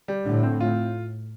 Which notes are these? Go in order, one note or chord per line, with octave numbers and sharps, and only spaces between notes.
G3
A2 D3
C4
F4